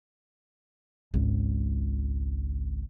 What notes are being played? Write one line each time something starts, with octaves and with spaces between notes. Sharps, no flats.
G#1 C#2